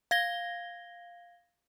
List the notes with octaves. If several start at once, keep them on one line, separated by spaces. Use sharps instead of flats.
F5 G#6 A#6 G7